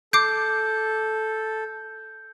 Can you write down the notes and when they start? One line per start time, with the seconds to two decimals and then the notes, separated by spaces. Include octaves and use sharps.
0.13 A4 D6 G6 C7 D7